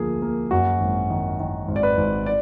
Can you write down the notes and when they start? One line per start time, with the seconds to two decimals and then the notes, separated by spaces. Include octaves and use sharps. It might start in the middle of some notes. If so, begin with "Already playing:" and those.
Already playing: D2 F3 A#3 G#4
0.22 A#3
0.51 F#2 F#4
0.80 G#1
1.10 D#3
1.40 D#3
1.68 G#1
1.76 D5
1.83 B4
1.97 G#1
2.26 D5